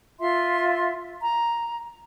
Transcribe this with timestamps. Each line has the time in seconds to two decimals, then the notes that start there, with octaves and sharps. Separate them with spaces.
0.20 F4 E5 C6
1.21 A#5